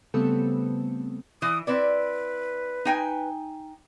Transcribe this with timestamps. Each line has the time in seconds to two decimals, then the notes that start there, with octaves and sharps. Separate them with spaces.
0.14 C#3 G3 A3 B3 C4 A4
1.42 E3 D#6
1.67 C4 E4 B4 D5
2.85 D#4 G5 G#5